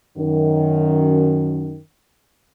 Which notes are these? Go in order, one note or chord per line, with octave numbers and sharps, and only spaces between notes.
F#2 D#3